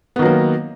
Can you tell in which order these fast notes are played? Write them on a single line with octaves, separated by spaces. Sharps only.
B3 D#3 F#3 A#3